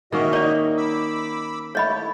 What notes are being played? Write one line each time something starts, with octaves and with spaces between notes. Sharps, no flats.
D#3 A#3 C#4 F#4 D#5 E5
D#4 C#5 D5
B5 D6 E6
A3 E4 C#5 D#5 B5